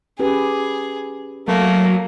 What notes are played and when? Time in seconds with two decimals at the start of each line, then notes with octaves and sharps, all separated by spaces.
0.19 C#4 G4 G#4 B4
1.48 F#3 A3 A#3